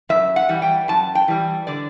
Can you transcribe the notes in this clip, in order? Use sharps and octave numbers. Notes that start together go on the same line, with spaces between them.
F#2 E5
F#5
E3 G3
G5
F#2 A5
G5
E3 G3
D3 D5